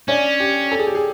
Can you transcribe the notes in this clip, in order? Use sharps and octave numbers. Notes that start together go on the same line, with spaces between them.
C#4 D4
G4
A4
G#4
G4
G#4